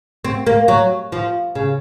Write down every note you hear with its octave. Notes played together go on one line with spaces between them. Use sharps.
C4
A#3
F#3
F3
C#3